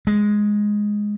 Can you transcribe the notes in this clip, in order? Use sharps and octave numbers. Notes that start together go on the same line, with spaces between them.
G#3